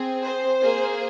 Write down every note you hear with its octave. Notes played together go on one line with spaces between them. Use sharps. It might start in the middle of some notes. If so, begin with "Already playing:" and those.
Already playing: C4 G#4
C5
A#3 G#4